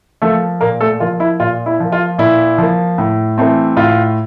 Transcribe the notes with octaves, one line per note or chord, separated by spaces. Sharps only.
F3 A3 A#3 A4
A#2 A#3 A#4
A3 A4
F3 A#3 F4
E4
A#2 F4
E4
F3 A#3
F4
A#2 E4
F3 A#3
A2
E3 A3 C4
A2 F4